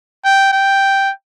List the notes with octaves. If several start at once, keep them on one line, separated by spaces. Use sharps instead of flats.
G5
G5